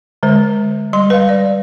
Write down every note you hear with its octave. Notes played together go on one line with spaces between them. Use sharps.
D3 G#3 C5
G3 C6
B4 F5
D5